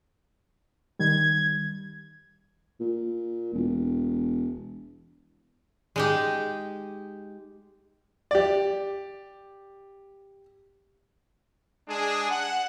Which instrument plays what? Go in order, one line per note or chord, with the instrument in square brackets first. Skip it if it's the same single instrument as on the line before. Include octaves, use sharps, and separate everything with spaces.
[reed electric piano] D#3 G3 [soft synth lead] G#6
[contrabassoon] A#2
E1
[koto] G#3 D#4 G4
[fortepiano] G4 D5
[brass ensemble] G#3 D4 G#4
F#5